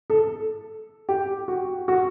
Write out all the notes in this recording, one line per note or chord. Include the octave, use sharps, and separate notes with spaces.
A4
G4
F#4
F#4